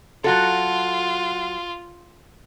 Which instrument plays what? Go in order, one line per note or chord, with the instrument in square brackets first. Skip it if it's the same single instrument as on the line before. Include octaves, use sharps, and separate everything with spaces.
[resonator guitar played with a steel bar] F#3 F#4 A4 [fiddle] F4